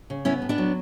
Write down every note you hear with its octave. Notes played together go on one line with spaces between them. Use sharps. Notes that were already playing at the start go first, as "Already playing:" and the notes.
C#3
B3 C#4 E4
A2
B3 D4
F#3